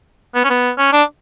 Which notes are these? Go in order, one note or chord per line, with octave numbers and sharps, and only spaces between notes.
B3
C#4
B3
C#4
D4